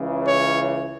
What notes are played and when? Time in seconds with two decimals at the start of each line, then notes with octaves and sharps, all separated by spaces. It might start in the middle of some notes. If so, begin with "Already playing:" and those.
Already playing: C#2 C#3 E3
0.27 C#5